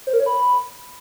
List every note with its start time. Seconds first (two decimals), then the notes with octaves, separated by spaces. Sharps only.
0.07 C5
0.13 A#4
0.20 C#5
0.26 B5